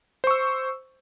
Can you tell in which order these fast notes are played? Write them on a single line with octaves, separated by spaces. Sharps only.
C5 C#6 E6